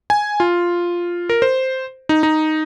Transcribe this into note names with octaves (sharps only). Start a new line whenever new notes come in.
G#5
F4
A#4
C5
D#4
D#4